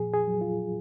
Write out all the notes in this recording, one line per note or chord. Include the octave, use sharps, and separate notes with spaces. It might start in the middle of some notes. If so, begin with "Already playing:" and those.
Already playing: A#2 F3 G#4
G#4
F#3
F4